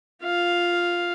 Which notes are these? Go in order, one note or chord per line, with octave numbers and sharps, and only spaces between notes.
F4 F5